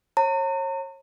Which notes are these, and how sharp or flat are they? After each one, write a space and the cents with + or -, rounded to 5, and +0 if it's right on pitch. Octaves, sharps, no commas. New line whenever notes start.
C#5 -35 A#5 -40